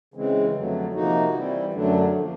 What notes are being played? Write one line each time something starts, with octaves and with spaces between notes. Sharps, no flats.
C#3 E3 G#3 C4
F2 D3 F#3 A3
C3 F3 A#3 D#4 F#4
E3 G3 C4 E4
F#2 D3 F#3 A3 D4
F3 A#3